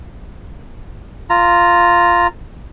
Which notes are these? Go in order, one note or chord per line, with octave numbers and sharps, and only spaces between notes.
F4 A#5